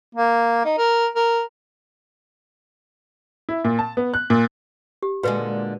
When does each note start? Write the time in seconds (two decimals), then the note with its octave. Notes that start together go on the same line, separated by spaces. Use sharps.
0.15 A#3
0.65 D#4
0.78 A#4
1.15 A#4
3.49 E4
3.64 A#2
3.79 A5
3.97 B3
4.14 F#6
4.30 A#2
5.02 G4
5.23 A#2 D3 G#3 F#4 B4